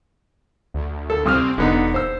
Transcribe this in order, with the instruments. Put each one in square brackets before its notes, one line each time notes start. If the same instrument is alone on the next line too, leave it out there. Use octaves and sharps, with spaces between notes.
[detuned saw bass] D2
[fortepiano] A4
[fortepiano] C2 D#6 F6 [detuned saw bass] C4
[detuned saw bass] E1 [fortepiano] D3 B3 D#4
[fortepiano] C5 E6